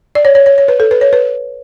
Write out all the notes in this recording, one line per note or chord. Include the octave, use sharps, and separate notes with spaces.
D5
C#5
C#5
C#5
C#5
B4
A4
B4
C#5
B4